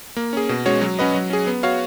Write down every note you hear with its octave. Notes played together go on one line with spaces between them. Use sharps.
A#3
C#4 G#4
B2
G#3 C#4 F#4 C#5
F#3
C#4 F#4 B4 D#5
F#3
C#4 G#4
B3
F#4 C#5 F5